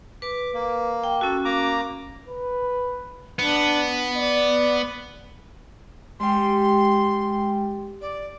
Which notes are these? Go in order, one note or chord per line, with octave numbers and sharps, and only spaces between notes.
B4 D6
A#3
G5
C#4 F#4 A4
A#3 A#5 D6
B4
B3 D4
D5
G3 G#3 G5 C6
D5